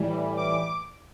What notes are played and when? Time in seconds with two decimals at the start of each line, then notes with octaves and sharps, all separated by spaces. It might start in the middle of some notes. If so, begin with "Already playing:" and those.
Already playing: A2 E3 G3
0.37 D6